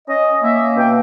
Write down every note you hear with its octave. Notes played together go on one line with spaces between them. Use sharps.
C#4 D#5
A#3 E5
B2 G5